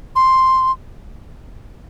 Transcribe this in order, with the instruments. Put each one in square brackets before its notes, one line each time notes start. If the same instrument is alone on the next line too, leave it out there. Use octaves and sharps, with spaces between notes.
[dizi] C6